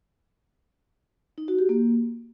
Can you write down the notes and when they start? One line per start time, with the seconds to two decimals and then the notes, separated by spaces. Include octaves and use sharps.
1.38 D#4
1.48 F#4
1.59 G4
1.69 A#3